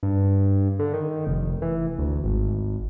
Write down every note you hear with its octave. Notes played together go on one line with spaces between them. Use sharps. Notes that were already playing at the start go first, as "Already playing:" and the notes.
G2
D3
D#3
F1
E3
D2
G#1